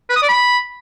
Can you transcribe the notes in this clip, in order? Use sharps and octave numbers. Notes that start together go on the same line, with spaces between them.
B4
D#6
D5
B5